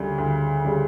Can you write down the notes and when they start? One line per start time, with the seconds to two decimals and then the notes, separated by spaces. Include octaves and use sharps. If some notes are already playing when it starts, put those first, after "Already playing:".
Already playing: D2 C#3 G3
0.18 D2
0.64 C#3 G3